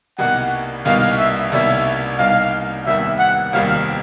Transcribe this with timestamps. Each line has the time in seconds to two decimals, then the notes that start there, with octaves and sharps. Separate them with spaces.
0.18 C2 B2 G3 A#3 D#4 F#5
0.85 C2 B2 G3 A#3 D#4 F5
1.18 E5
1.52 C2 B2 G3 A#3 D#4 E5
2.19 C2 B2 G3 A#3 D#4 F5
2.87 F1 D#2 D#3 G3 B3 E5
3.19 F#5
3.53 F1 D#2 D#3 G3 B3 F5